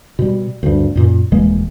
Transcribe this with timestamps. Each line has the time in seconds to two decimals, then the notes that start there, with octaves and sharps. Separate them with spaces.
0.19 B2 G3
0.63 D2 G2
0.95 F#2 A#2
1.32 D#1 E3 G#3 A#3